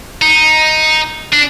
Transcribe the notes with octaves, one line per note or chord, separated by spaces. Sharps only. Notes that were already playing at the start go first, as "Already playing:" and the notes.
D#4
D4